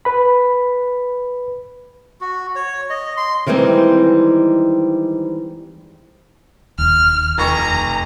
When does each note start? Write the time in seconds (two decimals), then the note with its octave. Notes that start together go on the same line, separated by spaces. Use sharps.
0.05 B4 B5
2.21 F#4
2.56 C#5
2.90 D#5
3.17 C6
3.47 D#3 E3 G3 G#3 C4
6.78 E1 D#2 F6
7.38 F1 A#5 C#6